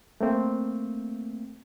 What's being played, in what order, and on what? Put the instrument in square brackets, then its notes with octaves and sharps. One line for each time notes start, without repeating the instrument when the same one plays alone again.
[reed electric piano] A3 A#3 C4